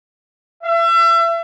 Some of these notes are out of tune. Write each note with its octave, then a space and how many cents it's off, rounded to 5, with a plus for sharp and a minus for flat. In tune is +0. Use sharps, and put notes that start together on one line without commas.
E5 +35